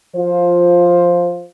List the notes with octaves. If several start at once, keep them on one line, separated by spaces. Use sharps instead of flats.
F3 F4 C5